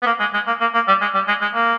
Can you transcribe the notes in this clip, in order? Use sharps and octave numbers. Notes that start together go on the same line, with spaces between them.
B3
A#3
G#3
G#3
A#3
A#3
A#3
G3
G#3
G3
G#3
G#3
A#3